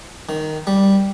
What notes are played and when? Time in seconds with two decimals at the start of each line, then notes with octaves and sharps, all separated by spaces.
0.29 D#3
0.67 G3